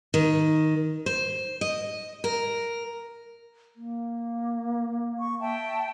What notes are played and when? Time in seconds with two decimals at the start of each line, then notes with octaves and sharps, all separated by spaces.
0.14 D#3
1.06 C5
1.61 D#5
2.24 A#4
3.76 A#3
5.19 C#6
5.41 E5 G5 A5